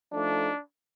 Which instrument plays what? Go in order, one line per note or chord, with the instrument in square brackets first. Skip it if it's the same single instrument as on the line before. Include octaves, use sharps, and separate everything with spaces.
[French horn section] F3 A3 D#4 A4 [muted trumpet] D4